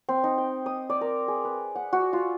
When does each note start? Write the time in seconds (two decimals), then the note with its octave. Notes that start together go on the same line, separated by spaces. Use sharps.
0.09 C4
0.24 D#4
0.38 G5
0.66 D#6
0.90 D5
1.01 A#4
1.28 G#4
1.45 B4
1.76 F#5
1.93 F#4
2.13 F4